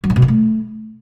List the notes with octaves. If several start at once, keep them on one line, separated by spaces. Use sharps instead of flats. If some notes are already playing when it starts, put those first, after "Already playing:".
F#3
G#2
B2
G2
A3